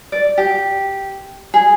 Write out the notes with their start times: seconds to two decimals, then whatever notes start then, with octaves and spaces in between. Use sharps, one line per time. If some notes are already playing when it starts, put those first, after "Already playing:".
0.12 D5
0.38 G4
1.54 G#4